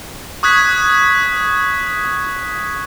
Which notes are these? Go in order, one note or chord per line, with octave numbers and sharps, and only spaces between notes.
C#6 D#6 F#6 G#6 B6